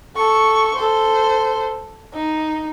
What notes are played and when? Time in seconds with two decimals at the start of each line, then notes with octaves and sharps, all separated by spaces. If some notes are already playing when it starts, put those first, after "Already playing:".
0.16 A4 C#6
0.75 A4 C5
2.13 D#4